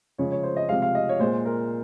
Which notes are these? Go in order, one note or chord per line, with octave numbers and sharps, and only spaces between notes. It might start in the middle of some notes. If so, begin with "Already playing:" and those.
C#3 F3 G#3 C#5
C#5
C5
D#5
C3 F3 G#3 F5
F5
D#5
C#5
A#2 G#3 C5
A#4